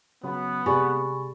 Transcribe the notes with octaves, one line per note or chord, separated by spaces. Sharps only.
C#3 F#3 B3
C3 G4 G#4 D5 G#5 B5 C#6 A6